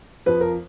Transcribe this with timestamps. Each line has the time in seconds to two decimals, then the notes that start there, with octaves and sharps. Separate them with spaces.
0.26 F2 F3 B4
0.41 A#4